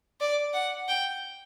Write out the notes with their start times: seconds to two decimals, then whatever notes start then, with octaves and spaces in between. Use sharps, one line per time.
0.21 D5
0.54 F#5
0.89 G5